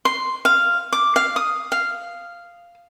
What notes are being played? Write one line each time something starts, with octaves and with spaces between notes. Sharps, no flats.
C6
F5
D6
F5
D#6
F5